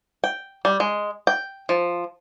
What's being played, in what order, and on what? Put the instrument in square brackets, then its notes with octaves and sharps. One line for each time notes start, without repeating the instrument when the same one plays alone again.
[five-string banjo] G5
G3
G#3
G5
F3